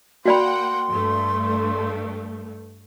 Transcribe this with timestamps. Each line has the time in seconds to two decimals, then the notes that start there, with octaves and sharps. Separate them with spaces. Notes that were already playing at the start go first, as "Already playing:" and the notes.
0.25 A#3 F#4 D5 F#5 G5 B5 C6
0.89 G2 A3